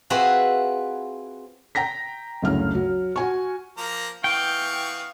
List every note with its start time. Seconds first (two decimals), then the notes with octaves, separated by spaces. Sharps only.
0.10 C4 F4 F#4 G#4 B4 E5
1.75 G5 A#5 A#6 B6
2.42 F#1 D2 G2 C#3 F6
2.75 F#3
3.16 F#4 G#5 C#6
3.77 F3 A#3 A#5
4.24 E3 B3 F5 G5 C#6